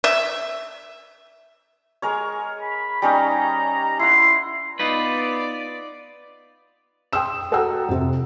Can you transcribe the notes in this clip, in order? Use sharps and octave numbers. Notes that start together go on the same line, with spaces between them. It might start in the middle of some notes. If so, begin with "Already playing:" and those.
E5
G#3 A#4 C#5
B5
G3 C#4 D#4 A#5
E4 F#5 C6
B3 D#4 F4 B4 D5
G5 C6 D#6 E6 E7
F#4 A4 F#5 G5 A#5 E6
F2 C3